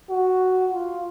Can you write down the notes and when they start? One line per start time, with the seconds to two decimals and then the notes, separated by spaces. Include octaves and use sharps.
0.10 F#4
0.72 F4